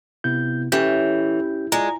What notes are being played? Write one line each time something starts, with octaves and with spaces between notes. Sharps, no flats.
C3 B3 E4 G6
E3 C#4 G4 A4 B4 C#5 G6
G#3 F4 D5 A#5